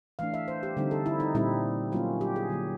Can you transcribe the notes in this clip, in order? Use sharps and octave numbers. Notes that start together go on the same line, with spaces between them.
E3 A3 D4 F5
E5
C5
G4
D3 G3 C4 D#4
A4
E4
D#4
A#2 G3 C4 D#4 E4
F#3 A#3 C#4 F4
G4
G#4
D3 F#3 A#3